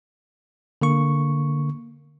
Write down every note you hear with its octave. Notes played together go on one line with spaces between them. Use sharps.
D3 A#3 C#6